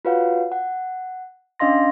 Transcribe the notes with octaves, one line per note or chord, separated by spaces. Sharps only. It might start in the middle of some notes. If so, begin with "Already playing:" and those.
F4 F#4 B4 C#5 F5 F#5
F#5
C#4 D4 D#5 F5 C6 A#6